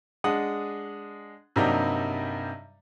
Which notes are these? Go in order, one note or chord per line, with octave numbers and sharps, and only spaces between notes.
G#3 D4 F#5 D#6
G2 C3 F#3 G3 A#3 D#4